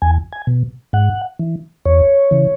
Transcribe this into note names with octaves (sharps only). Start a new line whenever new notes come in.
E2 G#5
G#5
B2
G#2 F#5
E3
E2 C#5
C#3 E3